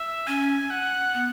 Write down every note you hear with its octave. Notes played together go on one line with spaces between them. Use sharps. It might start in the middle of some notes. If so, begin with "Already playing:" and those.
Already playing: E5
C#4 G#5
F#5
B3